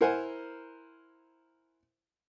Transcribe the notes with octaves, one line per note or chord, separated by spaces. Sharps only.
E4 A#4 C5 F#5 G#5